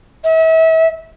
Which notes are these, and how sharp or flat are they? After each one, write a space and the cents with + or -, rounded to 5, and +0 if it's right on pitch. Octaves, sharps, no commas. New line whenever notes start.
E5 -35